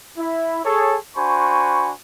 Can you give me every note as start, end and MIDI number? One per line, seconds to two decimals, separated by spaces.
0.18 0.61 64
0.65 0.96 68
0.65 0.96 69
0.65 0.96 73
1.16 1.91 62
1.16 1.91 66
1.16 1.91 72
1.16 1.91 80
1.16 1.91 83
1.16 1.91 85